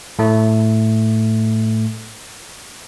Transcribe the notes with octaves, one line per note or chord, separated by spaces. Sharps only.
A2 A3